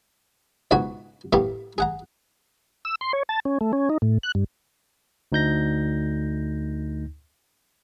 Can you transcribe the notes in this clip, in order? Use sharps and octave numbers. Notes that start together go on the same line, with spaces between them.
C#2 G#2 B2 F#4 G#5 B5
A2 A#3 B3 G4 E5
G#4 F#5 A#5
E6
C6
C#5
A5
C#4
A3
C#4
D#4
A2
F#6
G2
D2 D#4 G6 A#6